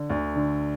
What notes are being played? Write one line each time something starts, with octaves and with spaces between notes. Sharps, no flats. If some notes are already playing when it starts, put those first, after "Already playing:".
Already playing: D3
D2
D3